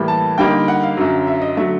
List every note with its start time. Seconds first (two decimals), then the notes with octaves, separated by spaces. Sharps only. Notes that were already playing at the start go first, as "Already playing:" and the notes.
Already playing: A2 E3 G3 A#3
0.08 A5
0.38 D3 G3 A#3 D#4 G5
0.68 F#5
0.83 F5
0.97 F#2 D3 F#3
1.27 E5
1.42 D#5
1.57 D3 F#3 A3 E5